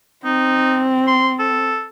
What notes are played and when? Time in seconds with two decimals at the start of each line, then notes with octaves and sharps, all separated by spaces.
0.25 C4 D#4
1.07 C6
1.39 A4